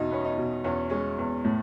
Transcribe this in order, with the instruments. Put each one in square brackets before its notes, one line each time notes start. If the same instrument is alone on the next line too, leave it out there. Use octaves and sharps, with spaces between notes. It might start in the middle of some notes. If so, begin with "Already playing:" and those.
Already playing: [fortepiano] E2 B2 D#4
B3 C#4
D#4
B2
E2 C#4
G#3 C#4
E2
A2